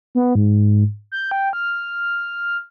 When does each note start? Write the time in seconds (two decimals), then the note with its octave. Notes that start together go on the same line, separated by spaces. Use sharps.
0.15 B3
0.35 G#2
1.12 G6
1.31 G5
1.53 F6